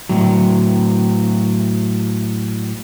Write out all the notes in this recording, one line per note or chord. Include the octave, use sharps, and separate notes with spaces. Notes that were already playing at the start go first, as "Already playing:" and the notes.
A2 F#3